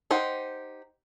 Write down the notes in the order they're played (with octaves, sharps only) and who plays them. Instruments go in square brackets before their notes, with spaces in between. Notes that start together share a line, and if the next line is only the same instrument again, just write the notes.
[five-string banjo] D#4 G4 C5 F#5